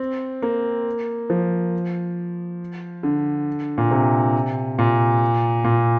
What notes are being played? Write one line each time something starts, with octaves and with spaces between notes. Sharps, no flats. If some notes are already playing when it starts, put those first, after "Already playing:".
Already playing: C4
A#3
F3
D3
A#2
C3
A#2
A#2